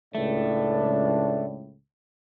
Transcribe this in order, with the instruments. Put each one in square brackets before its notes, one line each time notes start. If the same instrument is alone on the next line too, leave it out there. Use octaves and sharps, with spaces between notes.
[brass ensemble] C#2 A2 [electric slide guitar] A3 [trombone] D4